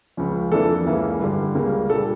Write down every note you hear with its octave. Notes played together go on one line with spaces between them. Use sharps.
C#2 C#3 F3 C#4
F2 E3 A#3 D4 A4
C#2 C#3 E3 A#3 C#4
G2 D3 G3
C#2 C#3 G3 A#3
A#2 G3 A#3 D4 A4